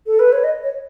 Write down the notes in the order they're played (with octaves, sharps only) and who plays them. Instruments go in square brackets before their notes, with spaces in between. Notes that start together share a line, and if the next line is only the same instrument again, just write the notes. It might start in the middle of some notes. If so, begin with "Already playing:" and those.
[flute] A4
B4
C#5
D#5
C#5